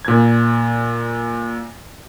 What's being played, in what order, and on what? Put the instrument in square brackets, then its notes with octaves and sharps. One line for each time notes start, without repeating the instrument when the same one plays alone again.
[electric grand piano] A#2 G#6